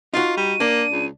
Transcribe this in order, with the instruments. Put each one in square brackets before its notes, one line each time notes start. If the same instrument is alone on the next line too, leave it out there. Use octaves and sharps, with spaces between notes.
[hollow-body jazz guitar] D#4 F#4 [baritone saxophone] F4
[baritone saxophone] G3 [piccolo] D#7
[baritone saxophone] A#3 [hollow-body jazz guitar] D4
[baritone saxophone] C#2